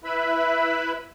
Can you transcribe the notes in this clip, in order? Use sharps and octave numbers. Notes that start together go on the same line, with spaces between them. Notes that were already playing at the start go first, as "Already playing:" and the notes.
E4 B4 E5 B5